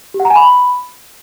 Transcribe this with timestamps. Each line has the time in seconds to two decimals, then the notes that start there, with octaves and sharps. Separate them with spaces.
0.14 G4
0.20 F#5
0.25 A#5
0.30 G#5
0.36 B5